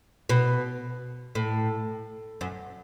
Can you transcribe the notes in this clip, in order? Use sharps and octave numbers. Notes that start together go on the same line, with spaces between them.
B2
A2
F#2